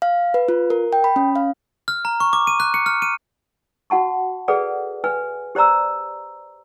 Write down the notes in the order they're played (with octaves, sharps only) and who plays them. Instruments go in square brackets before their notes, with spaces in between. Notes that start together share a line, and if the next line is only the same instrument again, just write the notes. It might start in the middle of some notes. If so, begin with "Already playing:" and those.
[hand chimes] F5
B4
F4
A#4
G5
B5
C#4
F5
[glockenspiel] F6
A#5
C#6
D6
D#7
F#6
C#7
F6
D#7
[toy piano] F#4 F#5 A5 C#6
G#4 A4 B4 D5 F#5
B4 G#5
G4 C5 D5 A#5 E6